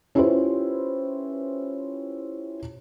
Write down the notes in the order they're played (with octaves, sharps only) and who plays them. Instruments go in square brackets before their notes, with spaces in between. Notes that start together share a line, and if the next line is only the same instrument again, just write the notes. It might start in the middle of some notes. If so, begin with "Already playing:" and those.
[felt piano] C#4 E4 F4 G4 B4 C5